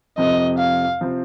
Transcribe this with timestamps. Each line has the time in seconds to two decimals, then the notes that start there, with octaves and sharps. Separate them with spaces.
0.17 F2 C3 F3 C4 D#5
0.59 F5
1.01 C3 F3 C4